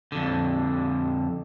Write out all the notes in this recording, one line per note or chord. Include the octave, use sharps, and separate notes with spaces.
F2 D3